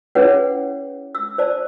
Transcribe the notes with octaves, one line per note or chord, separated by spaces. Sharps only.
C#4 E4 G#4 B4 C#5 F#5
E6
C5 D5 A5